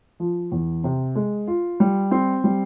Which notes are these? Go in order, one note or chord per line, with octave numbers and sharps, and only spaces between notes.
F3
E2
C3
G#3
F4
G3
C4
G3